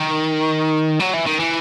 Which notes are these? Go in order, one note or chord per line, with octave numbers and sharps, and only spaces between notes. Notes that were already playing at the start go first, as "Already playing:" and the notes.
Already playing: D#3
F#3
E3
D#3
E3